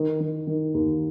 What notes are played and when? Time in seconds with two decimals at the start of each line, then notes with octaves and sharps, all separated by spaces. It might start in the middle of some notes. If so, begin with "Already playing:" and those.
Already playing: D#3
0.20 D#3
0.47 D#3
0.74 D#2